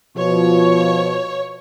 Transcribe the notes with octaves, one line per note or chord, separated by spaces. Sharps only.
B2 F3 C#5